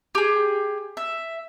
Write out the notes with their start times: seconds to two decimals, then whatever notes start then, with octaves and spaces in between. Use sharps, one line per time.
0.15 G4 G#4
0.97 E5